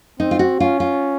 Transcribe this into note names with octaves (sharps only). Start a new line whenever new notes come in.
C4 D#4
F4
F#4
C#4 F4
F4